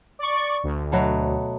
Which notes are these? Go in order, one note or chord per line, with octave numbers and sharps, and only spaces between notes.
D5 C#6
D2
B2 F#3 A3